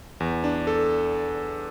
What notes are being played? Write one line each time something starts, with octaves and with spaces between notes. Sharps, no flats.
E2
D4
A4